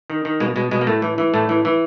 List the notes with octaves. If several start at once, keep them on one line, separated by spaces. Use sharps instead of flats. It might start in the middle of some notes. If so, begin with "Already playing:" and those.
D#3
D#3
B2 G#3 A#3
B2 G#3
B2 G#3
A#3
A2 A3
E3
E3
A2 A3
E3
E3